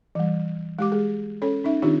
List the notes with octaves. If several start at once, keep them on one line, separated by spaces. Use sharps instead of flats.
E3 G3
G#3 G4 D6
G#3 G#4
C#4 A4 C#5
C#4 D#4 E5
D#3 C4 D4 D#4 F4 G4